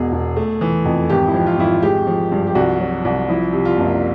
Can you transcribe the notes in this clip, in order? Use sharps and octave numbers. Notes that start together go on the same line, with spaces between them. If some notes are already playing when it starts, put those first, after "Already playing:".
Already playing: E1 B2 G#4
E1
A3
E3
F2
G#1 G4
E4
F3
F4
G#1 E4
F4
G#3 G4
F3
G2
G4
C2 F#4
F#3
C2
F3 E4
C3
F4
F#1